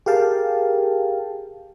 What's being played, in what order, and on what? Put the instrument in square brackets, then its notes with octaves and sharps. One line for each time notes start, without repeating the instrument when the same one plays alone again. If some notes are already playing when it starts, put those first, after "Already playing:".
[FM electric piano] G4 G#4 A#4 F5 G5 A5